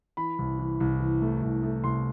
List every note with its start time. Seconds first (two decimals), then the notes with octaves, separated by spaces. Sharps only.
0.17 E3 B5
0.39 C2
0.59 E3
0.80 C2
1.00 E3
1.22 A3
1.42 C2
1.63 A3
1.84 C2 C6